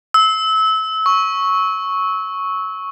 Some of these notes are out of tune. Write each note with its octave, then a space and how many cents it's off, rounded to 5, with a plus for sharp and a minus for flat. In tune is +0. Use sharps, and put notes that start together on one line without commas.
E6 -25
C#6 +0